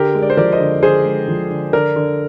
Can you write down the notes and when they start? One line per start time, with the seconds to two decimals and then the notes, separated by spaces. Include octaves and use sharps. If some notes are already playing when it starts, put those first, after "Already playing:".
Already playing: D3 G4 A#4
0.15 G#3
0.22 D5
0.30 C5
0.37 F3 A#4 D5
0.52 C5 D#5
0.60 D3
0.83 D3 G#4 C5
1.05 G#3
1.28 F3
1.50 D3
1.73 D3 A#4 D5
1.96 D3